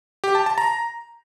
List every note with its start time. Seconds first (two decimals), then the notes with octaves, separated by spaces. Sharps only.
0.24 G4
0.35 A5
0.46 A5
0.58 A#5